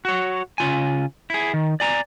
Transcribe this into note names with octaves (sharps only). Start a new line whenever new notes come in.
F#4 C#5
C#3 F4 G#5
E4 G#4
D#3
D5 G#5 A#5